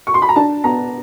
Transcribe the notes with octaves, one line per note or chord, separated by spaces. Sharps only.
C#6
C6
B5
A#5
D4 A5
B3 A#5